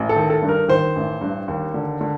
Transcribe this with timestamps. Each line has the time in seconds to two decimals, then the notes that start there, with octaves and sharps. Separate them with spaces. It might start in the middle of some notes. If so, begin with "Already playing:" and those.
Already playing: A1
0.09 A4
0.16 D#3
0.30 A4
0.42 G2
0.49 A#4
0.68 D#3 C5
0.96 A1
1.21 G2
1.48 D#2
1.74 D3
2.01 D3